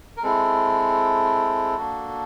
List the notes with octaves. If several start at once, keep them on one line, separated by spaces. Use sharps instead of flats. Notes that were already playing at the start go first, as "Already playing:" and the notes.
A#4
G#3 C4 E4 A4
A#3 D4 F#4